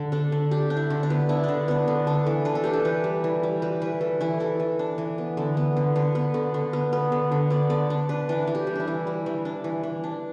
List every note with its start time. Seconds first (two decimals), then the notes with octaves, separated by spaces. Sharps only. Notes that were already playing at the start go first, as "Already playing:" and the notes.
Already playing: D3
0.12 D4 A4
0.32 D3
0.51 D4 G4
0.70 D4
0.77 E4
0.90 D3
1.03 D4
1.10 B3
1.29 D4 E4
1.44 D3 D4
1.68 B3 D4
1.88 D3
2.07 D4 A4
2.26 E3
2.45 D4 B4
2.55 A4
2.64 D4 G4
2.73 A4
2.85 E3 B4
3.04 G3
3.24 E3
3.43 G3
3.62 G3 B4
3.82 E3 B4
4.01 E3 A4
4.21 E3 E4
4.40 E3 A4
4.60 E3
4.79 D4
4.98 E3
5.18 B3
5.37 D3
5.57 B3
5.77 D3
5.96 D3 B4
6.15 B3
6.34 D3
6.54 D3
6.73 B3
6.93 B3
7.12 D3
7.32 D3
7.50 B3 D5
7.70 D3 D5
7.90 D4
8.09 D4 B4
8.29 E3 D4
8.47 E3
8.55 G4
8.67 G3
8.75 D4 E4
8.88 E3
9.07 G3
9.26 E3
9.45 D4
9.64 E3
9.83 E3
10.04 D4